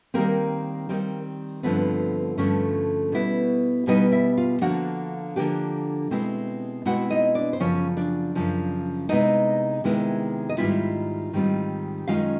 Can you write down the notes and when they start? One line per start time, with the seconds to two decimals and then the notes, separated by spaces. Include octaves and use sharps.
0.14 D#3 G3 A#3 C4 A#4
0.89 D#3 G3 C4
1.63 G2 D3 F3 A3 B3 C4 B4
2.37 G2 D3 F3 A3 C#4 C#5
3.12 B2 G3 B3 E4
3.87 B2 G3 B3 D#4 E4 D#5
4.12 E4 E5
4.37 F4 F5
4.61 D3 F3 A#3 D4 F#4 F#5
5.36 D3 F3 A#3 D4 G4 G5
6.11 B2 G#3 C4 E4
6.85 B2 G#3 C4 E4 F#4 F#5
7.10 D#4 D#5
7.35 D4 D5
7.53 C5
7.60 F#2 C#3 F3 C#4 C#5
7.97 D4 D5
8.35 F#2 C#3 F3
9.09 C3 D#3 G#3 B3 D#4 E4 D#5
9.84 C3 D#3 G#3 B3 E4
10.49 D#5
10.58 G#2 D#3 G3 C4 E4 F4 E5
11.33 G#2 D#3 G3 C4 F4
12.08 F#2 D#3 G#3 C#4 F4 F5